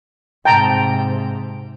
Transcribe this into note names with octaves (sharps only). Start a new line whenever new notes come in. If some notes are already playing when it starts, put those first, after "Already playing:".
G#2 C3 G5 A5 A#5